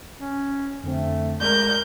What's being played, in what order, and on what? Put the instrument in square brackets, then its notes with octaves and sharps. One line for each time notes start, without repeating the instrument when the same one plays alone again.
[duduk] C#4
[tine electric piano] F2 D3 C4 [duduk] A3
[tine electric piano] G#3 D5 [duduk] A#4 [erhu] G6